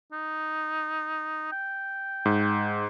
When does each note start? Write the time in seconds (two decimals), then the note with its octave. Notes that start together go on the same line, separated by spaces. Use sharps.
0.12 D#4
1.52 G5
2.25 G#2